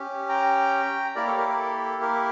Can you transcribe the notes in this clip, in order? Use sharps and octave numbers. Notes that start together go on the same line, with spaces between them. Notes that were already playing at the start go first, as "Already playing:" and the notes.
Already playing: C#4 G4
G5 A#5
A#3 E4 G4 A#4 D5
A4 C#5
A#4
A#4
A4
A#4